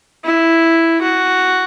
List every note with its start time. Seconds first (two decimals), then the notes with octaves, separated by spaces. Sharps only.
0.24 E4
1.02 F#4